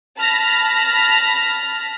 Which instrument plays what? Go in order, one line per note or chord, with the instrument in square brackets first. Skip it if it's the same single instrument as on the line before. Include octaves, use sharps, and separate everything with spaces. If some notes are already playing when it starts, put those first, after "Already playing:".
[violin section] A5 B5 F6 A#6 B6